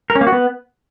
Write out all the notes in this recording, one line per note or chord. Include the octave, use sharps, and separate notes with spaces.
A#4
C#4
A#3
F#4
B3